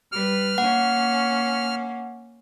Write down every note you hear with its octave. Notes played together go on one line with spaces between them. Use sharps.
G3 B4 F6
A#3 C#4 F#5